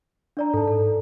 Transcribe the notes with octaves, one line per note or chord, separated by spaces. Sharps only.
D4 D5 A#5
G#2 A4 A5
A4